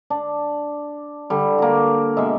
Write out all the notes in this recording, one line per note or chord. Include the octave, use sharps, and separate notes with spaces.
D4
D3 G3
A#3 F#4
B2 G#3 E5